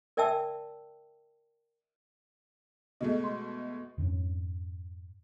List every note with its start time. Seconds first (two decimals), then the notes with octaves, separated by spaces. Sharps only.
0.17 A#4 D5 E5 G5 A5 E6
3.01 B2 G#3 A3 D#5
3.24 C6
3.98 F2 G#2 A#3 C#4